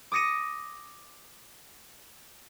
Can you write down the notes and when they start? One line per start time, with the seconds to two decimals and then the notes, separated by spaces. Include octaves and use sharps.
0.12 D6 D#6 A#6 C#7 D#7